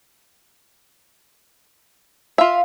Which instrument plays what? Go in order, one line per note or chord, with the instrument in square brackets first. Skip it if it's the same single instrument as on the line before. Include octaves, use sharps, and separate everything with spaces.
[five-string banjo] F4 E5 [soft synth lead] F5